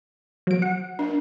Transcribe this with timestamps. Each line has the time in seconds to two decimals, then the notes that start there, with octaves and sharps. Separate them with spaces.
0.47 F#3 D7
0.62 F#5
0.99 D4